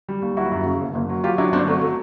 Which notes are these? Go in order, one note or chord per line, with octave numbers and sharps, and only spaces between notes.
G3
D#2
F#3 E4 F#4
F#2
C#3
F#1
F#1
F#3
F#3 F4 G4
F#3 D4 E4
G1 C4 D4
F#3 A3
F#3 A3